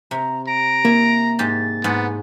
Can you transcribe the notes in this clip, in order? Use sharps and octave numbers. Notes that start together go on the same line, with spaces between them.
C3 A#5
A#5 D7
A#3 E4
G#2 G4 A6
G#2 B3